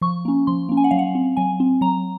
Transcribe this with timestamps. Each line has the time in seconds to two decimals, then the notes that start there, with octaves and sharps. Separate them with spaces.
0.01 F3 C#6
0.25 A#3 C#4
0.47 F3 C6
0.69 A#3 C#4
0.77 G#5
0.84 F#5
0.91 F#3 F5
0.99 F#5
1.15 C4
1.37 F#3 G#5
1.60 C4
1.81 F#3 A#5